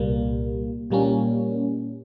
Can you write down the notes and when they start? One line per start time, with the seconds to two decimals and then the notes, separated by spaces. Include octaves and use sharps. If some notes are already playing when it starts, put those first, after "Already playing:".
Already playing: C2 A#2 G3 A#3
0.90 A#2 G3 A#3 C#4